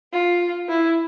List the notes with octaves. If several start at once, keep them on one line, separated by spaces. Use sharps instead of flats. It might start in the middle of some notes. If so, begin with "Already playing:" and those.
F4
E4